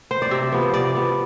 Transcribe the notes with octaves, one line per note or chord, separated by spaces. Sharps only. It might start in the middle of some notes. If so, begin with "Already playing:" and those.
C5
D5
C3 E5
F3 B3
C3 D5
F3 B3